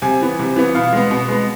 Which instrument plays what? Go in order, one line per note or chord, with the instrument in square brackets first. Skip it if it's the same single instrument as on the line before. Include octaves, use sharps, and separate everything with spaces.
[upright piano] C3 G#5
E3 B3
C3
E3 B3
B2 F5
G#3 B3
B2
G#3 B3